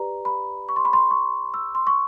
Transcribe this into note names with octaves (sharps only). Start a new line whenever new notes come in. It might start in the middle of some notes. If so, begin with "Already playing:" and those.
Already playing: G4 B4 D5 A#5
B5
C#6
C6
B5
C6
C#6
E6
C6
C#6